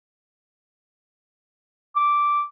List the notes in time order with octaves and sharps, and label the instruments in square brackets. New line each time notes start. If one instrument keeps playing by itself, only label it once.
[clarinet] D6